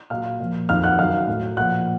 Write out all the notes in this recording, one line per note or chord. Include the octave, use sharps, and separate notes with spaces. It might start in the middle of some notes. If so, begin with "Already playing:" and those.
A#2 F#3 F5 F6
A#2 F3
F2 D#3 F#3 F5 F6
F#5 F#6
F#2 D#3 F#3 F5 F6
A2 F#3
A#2 F3 F#5 F#6